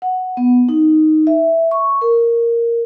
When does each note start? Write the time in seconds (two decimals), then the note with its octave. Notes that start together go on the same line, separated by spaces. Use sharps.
0.02 F#5
0.37 B3
0.69 D#4
1.27 E5
1.71 C#6
2.01 A#4